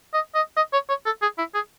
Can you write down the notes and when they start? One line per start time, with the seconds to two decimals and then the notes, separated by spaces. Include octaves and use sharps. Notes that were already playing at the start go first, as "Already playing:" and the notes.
0.13 D#5
0.35 D#5
0.56 D#5
0.73 C#5
0.89 C#5
1.05 A4
1.22 G#4
1.38 E4
1.54 G#4